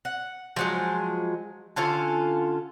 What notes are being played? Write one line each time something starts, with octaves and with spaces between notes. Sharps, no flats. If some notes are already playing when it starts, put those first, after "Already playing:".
F#5
F3 F#3 G#3
D3 C#4 F4 A4